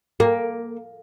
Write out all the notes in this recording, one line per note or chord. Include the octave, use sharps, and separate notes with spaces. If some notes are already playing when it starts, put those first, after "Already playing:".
A#3